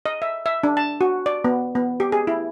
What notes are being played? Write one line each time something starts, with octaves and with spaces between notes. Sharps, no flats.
D#5
E5
E5
D4
A5
F#4
D5
B3
B3
G4
G#4
E4